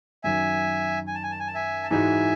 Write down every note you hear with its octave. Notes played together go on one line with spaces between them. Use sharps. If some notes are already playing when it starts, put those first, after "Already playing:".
F#2 D#3 F#3 E5 G#5
G#5
A5
G#5
A5
G#5
A5
E5 G#5
A5
G#2 E3 G#3 D#4 F#4 E5 G#5